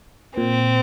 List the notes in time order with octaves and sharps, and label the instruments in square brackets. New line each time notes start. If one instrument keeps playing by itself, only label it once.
[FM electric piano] A#2 [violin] C4